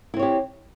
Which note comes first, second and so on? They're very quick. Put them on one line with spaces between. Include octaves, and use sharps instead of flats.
E4 C4 C#5 G4